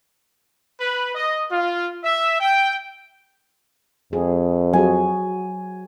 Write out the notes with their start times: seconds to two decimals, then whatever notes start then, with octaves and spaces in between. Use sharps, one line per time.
0.79 B4
1.15 D#5
1.50 F4
2.03 E5
2.40 G5
4.13 F2 G#4
4.73 F#3 F#4 G#4 G#5